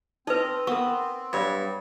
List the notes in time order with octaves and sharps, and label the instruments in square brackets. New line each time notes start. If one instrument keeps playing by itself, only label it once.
[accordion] C4 [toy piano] D#4 B4 [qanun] D#5
[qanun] B3 [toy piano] A#4 C#6
[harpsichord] G2 [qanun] C#5